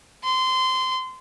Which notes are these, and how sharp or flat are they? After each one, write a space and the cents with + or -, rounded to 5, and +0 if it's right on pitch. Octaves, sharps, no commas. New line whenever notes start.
C6 -20